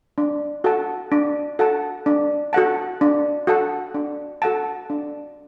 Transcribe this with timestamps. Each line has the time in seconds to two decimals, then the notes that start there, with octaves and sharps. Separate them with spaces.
0.18 D4
0.64 F#4 A4 F#5 A5
1.12 D4
1.59 F#4 A4 F#5 A5
2.06 D4
2.53 F#4 A4 F#5 A5
3.01 D4
3.47 F#4 A4 F#5 A5
3.94 D4
4.42 F#4 A4 F#5 A5
4.90 D4